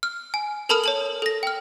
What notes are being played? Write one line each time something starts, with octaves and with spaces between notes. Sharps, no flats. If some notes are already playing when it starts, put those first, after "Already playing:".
F6
G#5
A4 A#4 A5 B5 D#6 F6
C#5 A5 F#7
A4 A#6
G5 F6